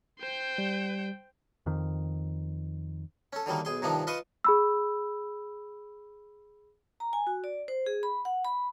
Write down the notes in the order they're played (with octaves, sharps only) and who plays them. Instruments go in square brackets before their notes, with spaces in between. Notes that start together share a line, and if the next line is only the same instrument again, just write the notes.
[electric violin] C5 G5
[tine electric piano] G3
[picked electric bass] F2 D#3
[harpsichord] C#4 A4
D3 D#3 F#3 G3 A#3
B1 G#4 C6
G2 C3 D#3 F3 D4 D#4
F4 B4 D#5 C6 C#6 D#6
[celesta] G#4 B5 E6
[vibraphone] A#5
G#5
F#4
D5
C5
G#4
B5
F#5
B5